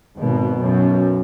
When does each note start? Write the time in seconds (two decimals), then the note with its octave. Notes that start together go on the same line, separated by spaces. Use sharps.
0.18 G#1 G#2 B2
0.62 B1 F#2